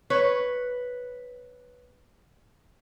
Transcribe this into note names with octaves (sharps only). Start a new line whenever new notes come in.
B4 C#5